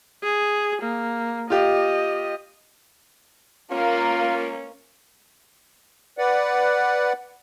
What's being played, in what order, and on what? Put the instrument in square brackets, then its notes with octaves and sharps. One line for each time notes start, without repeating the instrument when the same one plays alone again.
[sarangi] G#4
A#3
[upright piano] F4 G4 [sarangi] D#5
[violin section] A#3 [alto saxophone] C#4 [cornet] F4
[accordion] B4 D5 F#5